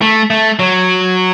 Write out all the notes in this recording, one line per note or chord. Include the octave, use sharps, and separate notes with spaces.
A3
A3
F#3